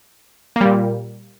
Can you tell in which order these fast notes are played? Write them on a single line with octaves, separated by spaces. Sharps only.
A#3 G3 A#2